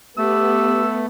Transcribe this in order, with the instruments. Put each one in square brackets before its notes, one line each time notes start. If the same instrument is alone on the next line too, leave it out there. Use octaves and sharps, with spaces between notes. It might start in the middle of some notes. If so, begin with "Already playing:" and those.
[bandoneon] A3 [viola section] B3 [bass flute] G4 [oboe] E6